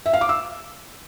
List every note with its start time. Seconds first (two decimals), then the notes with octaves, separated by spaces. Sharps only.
0.06 E5
0.13 F5
0.21 D6
0.29 E6